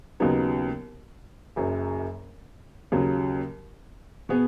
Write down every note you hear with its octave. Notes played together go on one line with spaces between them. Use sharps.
D#2 C#3 F#3 B3 D#4
F#1 F#2 F#3
D#2 C#3 F#3
B2 B3 G#4 B4